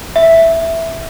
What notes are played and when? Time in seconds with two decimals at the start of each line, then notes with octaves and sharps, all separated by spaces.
0.16 E5